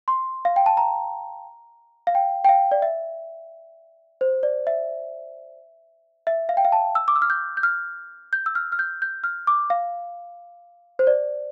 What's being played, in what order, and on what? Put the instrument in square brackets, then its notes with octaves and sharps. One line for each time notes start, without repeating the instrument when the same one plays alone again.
[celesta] C6
F5
G5
A5
A#5
F5
G5
G5
F5
D5
E5
C5
D5
E5
E5
F5
G5
F5
A5
E6
D6
E6
F6
G6
G6
F6
G6
E6
F6
F6
G6
G6
F6
D6
F5
C5
D5